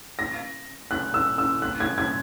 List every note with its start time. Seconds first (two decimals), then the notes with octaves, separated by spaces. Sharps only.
0.19 A#6
0.91 F#6
1.14 E6
1.38 E6
1.62 F#6
1.80 G#6
1.98 G#6